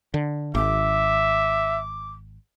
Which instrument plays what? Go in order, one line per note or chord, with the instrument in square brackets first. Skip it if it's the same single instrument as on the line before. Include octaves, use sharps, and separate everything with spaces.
[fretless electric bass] D3
[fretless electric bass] G#1 [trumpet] E5 [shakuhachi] D6